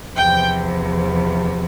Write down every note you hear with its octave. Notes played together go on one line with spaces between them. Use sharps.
E2 C3 F3 G5